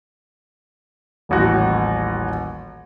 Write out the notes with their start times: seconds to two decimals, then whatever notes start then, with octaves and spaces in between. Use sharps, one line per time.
1.29 D#1 A1 F#4